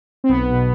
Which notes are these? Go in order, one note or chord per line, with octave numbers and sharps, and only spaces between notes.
C4
B1 B3
B2